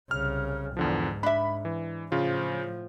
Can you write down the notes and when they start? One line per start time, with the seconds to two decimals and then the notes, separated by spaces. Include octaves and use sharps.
0.11 C2 C#3 F6
0.77 E2 G#2 D3 F3
1.23 D4 E5 B5
1.65 E3
2.12 A2 C#3 F3 F4